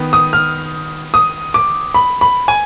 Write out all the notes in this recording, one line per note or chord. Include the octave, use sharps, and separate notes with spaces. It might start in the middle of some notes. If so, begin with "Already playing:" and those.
Already playing: D#3 B3
D#6
F6
D#6
D6
B5
B5
G#5